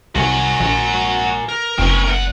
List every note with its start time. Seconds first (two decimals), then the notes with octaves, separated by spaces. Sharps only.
0.16 C2 F#4 A#4 C#5 G#5
0.60 A#1
1.49 A#4
1.78 F#1 C4 C#4
2.07 E2 F#5